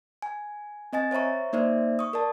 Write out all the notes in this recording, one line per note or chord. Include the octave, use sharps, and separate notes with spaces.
G#5
C4 D#5 G#5 A6
C5 C#5 E5 A#5 C#6
A#3 D#4 C5 D5 E5
C#6 D#6
A#4 D5 A5